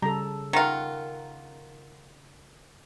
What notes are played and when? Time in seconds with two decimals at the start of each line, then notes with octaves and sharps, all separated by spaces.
0.02 C#3 G3 A4 A#5
0.53 D#3 F4 A#4 F#5 A#5